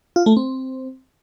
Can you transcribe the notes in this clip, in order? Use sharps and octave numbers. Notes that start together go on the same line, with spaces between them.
F4
A3
C4